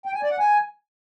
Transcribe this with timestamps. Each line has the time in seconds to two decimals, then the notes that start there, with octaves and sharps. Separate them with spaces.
0.05 G5
0.14 G#5
0.22 D5
0.31 F#5
0.39 G#5